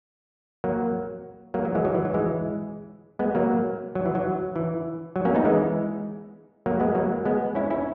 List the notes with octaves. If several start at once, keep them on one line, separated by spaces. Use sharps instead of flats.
F#3 A#3
F#3 A#3
F#3
E3 G#3
F#3
E3
F#3
E3 G#3
G#3 B3
F#3 A#3
F#3
E3
F#3
E3
F#3
A#3 C#4
B3 D#4
E3 G#3
F#3 A#3
G#3 B3
F#3 A#3
G#3 B3
C#4 E4
C#4 E4